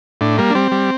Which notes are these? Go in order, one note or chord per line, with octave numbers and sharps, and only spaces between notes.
A2 D4
G3 A#3
D4
G3 C4
G3